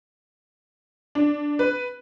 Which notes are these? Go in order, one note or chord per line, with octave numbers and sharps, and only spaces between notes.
D4
B4